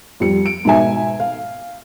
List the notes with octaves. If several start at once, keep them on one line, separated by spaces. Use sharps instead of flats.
F2 G3 C#7
D7
G#2 B2 E5 G#5
F5